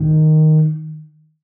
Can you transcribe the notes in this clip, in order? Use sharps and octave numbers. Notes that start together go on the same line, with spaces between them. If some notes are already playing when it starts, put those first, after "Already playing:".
Already playing: D#3